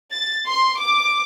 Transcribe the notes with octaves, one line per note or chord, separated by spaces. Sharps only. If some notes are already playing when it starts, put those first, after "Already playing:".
A6
C6
D6